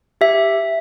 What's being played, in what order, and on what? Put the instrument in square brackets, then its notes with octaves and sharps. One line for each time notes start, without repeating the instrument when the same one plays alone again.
[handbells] G4 E5